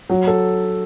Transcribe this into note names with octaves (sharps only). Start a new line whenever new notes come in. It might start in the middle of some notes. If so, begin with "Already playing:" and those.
F#3
A4